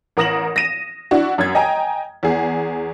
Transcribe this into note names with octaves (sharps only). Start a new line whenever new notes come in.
A1 A#4 D#6 A#6 E7 F#7
A#6 D#7 E7
D4 E4 F#4
F#2 G#6
D#5 G5 G#5 A#5
E2 G#4